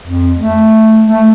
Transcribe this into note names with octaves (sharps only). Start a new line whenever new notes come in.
F2
A3
A3